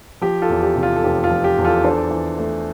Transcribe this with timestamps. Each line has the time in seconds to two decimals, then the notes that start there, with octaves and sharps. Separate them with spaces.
0.22 F3 G4
0.42 F4 A4
0.49 E2
0.63 G4
0.76 C3
0.83 F4
0.96 A4
1.04 F1 G4
1.24 F4
1.30 F3
1.44 G4
1.58 E2
1.64 F4 A4
1.84 D4 A4 C5
2.11 E3
2.39 A3